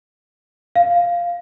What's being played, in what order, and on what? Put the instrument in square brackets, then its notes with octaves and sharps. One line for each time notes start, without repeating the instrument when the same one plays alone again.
[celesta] F5